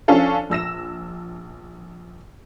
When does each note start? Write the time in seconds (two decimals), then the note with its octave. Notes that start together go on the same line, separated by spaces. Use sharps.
0.08 F3 C#4 D4 A4 F5
0.50 A#1 E6 A#6 E7